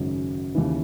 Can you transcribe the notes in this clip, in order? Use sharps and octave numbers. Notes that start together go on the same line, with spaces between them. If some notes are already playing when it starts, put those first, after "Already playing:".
Already playing: G#1 F#2 C#3
D#2 C#3 E3